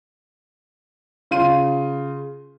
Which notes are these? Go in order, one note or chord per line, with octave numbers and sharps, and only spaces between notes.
C#3 F4 C6 D#7